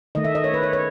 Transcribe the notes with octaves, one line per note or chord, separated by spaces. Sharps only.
D#3 A3 D#5
E5
D#5
C#5
B4
C#5
C#5